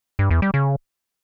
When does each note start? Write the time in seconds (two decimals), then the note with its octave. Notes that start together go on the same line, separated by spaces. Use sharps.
0.19 G2
0.31 E2
0.42 G3
0.54 C#3